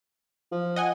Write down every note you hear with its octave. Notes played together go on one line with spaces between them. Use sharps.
F3
D#5 F#5 G#5